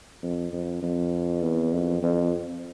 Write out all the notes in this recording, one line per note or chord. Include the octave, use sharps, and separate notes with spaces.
F2
F2
F2
E2
F2
F2